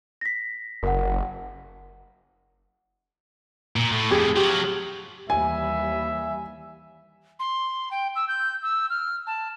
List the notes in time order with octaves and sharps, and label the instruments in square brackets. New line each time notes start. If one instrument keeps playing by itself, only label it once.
[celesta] A#6 B6
[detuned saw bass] F#1 [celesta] A#4 F#5
[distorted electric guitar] A#2
A2
[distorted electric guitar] F2 A2 [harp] G4 G#4
[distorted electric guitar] F#3 F4 [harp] G4
[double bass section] D#2 E3 G3 [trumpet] E5 [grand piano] G#5
[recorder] C6
G5
E6
G6
E6
F6
A5